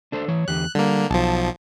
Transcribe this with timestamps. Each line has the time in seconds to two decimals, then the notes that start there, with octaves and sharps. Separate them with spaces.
0.12 D4 A4 C5
0.28 E3 C#5
0.48 E2 D3 G4 F#6
0.75 D3 G3 A#3
1.11 B1 F3 A5